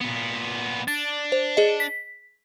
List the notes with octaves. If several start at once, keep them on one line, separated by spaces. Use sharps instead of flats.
A#2 B3
D4 A6
C5
G#4 D#5
B6